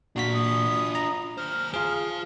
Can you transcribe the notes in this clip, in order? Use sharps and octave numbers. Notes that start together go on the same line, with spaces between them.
A#2 D4 F4 F#4 B6
D#6
A#5
D#2 C5 F6
F4 G#4 C5 F5